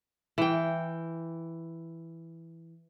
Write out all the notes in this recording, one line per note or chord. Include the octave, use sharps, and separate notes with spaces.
E3 G5